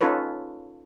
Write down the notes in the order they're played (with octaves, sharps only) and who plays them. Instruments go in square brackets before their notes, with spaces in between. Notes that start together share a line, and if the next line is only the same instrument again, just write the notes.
[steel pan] C#4 D#4 F4 A4 B4 C#5